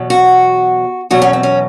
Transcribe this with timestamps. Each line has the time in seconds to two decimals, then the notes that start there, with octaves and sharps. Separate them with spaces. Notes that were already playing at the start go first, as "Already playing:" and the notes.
Already playing: E2 B2 F#3
0.10 F#4
1.10 E2 B2 F#3 F#4
1.22 C#4
1.33 C4
1.43 C#4